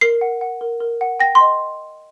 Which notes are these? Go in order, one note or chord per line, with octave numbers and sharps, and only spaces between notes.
A#4 C7
F#5
F#5
A#4
A#4
F#5
G5 A#6
C6
D#5